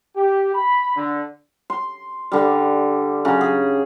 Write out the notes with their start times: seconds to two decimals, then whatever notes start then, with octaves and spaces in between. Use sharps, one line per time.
0.16 G4
0.55 B5
0.96 D3
1.70 C6
2.32 D3 G3
3.25 C#3 F#3
3.41 G#4